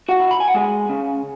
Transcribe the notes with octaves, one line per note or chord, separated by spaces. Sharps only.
F#4 F#5
E4
B5
G#5
F#5
G#3 G#4 G#5
C#3